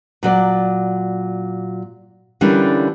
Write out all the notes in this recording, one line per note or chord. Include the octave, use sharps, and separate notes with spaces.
A#2 F#3 D5
D3 E3 G3 A#3 C#4 D4